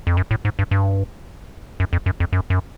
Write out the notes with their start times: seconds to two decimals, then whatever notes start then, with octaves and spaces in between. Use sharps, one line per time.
0.07 F2
0.17 F#2
0.31 A2
0.45 G#2
0.59 G2
0.71 G2
1.80 F#2
1.93 F2
2.06 F#2
2.20 F2
2.33 F#2
2.50 F#2